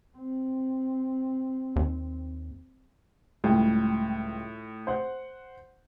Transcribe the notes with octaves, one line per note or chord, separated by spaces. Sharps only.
C4
D#2
C#2 A2 G3 G5
C5 F#5